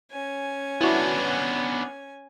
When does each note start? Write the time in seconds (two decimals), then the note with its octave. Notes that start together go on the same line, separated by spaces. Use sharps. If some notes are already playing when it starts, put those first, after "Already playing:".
0.11 C#4 G#5
0.81 B3 D4 E4 F#4